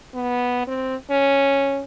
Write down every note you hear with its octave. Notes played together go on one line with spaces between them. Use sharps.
B3
C4
C#4